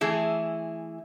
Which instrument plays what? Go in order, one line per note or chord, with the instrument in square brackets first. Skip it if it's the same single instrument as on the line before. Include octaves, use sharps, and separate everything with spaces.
[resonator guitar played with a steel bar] E3 A3 E4 G#4